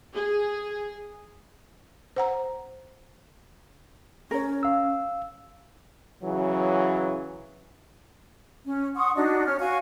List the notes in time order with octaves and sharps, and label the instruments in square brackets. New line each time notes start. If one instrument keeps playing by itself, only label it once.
[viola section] G#4
[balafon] C5 F#5 A#5
[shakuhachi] C#4 [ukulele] A#4 C#5
[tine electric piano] F5 E6
[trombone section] C#3 E3 F#3
[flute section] C#4
F#5 C6 C#6 D#6
D4 D#4 F#4 D#5
C#4 F6
F#4 F5 G#5 C#6